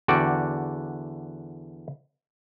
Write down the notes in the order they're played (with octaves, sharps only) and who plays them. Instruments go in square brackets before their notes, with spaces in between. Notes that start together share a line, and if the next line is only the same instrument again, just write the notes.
[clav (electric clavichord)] E2 D3 F#4 D5 G5